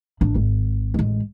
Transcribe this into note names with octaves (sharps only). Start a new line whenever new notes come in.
A1 D4
G#1
A1 G#3